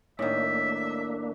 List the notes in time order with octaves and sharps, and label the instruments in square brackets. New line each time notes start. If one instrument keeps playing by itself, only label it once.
[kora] A2 D#3 [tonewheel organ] A#3 D4 [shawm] E5